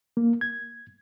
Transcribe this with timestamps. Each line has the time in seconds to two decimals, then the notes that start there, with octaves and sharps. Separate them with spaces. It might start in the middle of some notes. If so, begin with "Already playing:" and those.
0.17 A#3
0.41 G#6